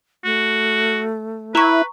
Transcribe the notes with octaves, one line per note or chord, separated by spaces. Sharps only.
A3 F#4
E4 B4 A#5 C#6